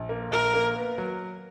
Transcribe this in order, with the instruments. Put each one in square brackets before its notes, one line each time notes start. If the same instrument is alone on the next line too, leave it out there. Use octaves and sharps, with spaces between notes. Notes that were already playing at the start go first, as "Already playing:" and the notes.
Already playing: [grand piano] A#1
A#3
[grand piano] A#1 [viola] A#4
[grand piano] A#3
B3
F#3